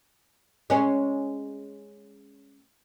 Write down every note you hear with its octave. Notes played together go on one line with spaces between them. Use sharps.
G#3 C#4